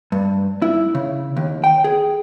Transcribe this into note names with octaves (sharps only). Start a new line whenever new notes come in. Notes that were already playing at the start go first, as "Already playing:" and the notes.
G2
E4
C#3
D#2
G5
G#4